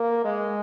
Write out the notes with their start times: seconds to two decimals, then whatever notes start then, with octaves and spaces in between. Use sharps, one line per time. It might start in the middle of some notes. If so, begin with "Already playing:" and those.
Already playing: A#3
0.25 G#3